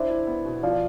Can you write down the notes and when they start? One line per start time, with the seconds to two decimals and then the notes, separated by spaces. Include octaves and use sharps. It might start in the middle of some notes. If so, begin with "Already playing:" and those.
Already playing: D4 E4 C5 E5
0.10 E4
0.27 B3
0.45 B2
0.63 F3 D5 F5